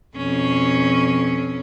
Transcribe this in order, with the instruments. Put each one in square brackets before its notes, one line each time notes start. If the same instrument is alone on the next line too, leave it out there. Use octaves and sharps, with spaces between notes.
[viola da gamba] F2 B2 C#4